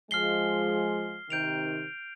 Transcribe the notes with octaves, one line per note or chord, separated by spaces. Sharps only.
F3 G#3 F6 C7 G7
C3 D#3 G6 D7 F7